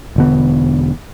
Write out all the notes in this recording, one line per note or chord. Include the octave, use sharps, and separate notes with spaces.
E1 D3 B3